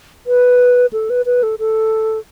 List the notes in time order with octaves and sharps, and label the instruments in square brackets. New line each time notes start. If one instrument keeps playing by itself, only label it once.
[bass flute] B4
A4
B4
B4
A4
A4